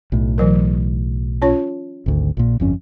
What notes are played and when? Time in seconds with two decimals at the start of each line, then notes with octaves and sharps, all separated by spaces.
0.12 B1 A2
0.38 E3 F#3 A#4
1.42 C#4 F4 C#5
2.06 G#1 D2
2.37 A#1 A#2
2.60 G1 F2 C#4